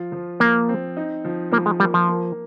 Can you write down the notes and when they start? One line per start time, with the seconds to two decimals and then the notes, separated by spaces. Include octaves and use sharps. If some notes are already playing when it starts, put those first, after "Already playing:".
Already playing: F3 F4
0.12 F3
0.40 F3 A#3
0.69 C4
0.97 D#4
1.25 F3
1.52 F3 A#3
1.66 G#3
1.80 G3 A#3
1.94 F3
2.08 A#3